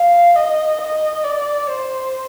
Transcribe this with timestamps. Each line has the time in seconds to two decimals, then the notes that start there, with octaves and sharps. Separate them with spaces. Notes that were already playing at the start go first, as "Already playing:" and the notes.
Already playing: F5
0.36 D#5
0.80 D#5
1.24 D5
1.69 C5